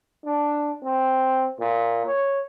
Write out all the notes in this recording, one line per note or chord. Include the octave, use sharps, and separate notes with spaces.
D4
C4
A#2
C#5